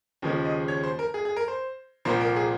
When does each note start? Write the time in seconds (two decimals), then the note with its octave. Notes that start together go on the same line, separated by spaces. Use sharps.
0.22 D#2 C#3 F3 G#3
0.45 D#5
0.68 C#5
0.83 C5
0.99 A#4
1.14 G#4
1.25 G#4
1.36 A#4
1.48 C5
2.05 C2 A#2 F3 A#3 C5
2.21 A#4
2.36 G#4